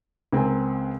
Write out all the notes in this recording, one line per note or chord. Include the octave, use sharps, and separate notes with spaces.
C#2 C4 A#4 G#5